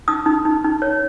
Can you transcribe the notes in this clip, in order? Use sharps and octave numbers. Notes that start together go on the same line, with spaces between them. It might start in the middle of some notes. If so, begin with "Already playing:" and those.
D#4 D#6
D#4
D#4
D#4
C#5